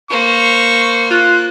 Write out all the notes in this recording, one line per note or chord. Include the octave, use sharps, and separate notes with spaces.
A#3 C5 C#6
F4 F#6